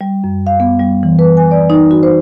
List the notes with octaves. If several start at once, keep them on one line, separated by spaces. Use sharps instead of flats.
G3
F#2
F5
B3
G3
E3
B4
G#5
D5
D#4
F#4
C5